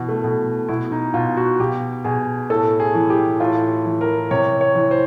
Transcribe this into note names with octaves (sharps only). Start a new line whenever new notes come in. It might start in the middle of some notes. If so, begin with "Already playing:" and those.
Already playing: B2 E3
A3
B2
B2 E4
D#4
B2 F4
F#4
B2 G4
B2 G#4
A2 A4
G#4
E3
G4
A2 F4
E3
A#4
C3 C#5
C#5
E3
C5